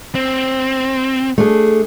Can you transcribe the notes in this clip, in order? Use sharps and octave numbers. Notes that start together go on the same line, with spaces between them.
C4
A3 D4 G#4